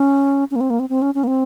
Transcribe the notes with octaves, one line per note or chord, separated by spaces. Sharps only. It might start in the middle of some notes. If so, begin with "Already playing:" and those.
Already playing: C#4
C#4
A#3
C4
A#3
C4
C4
C#4
C#4
A#3
C4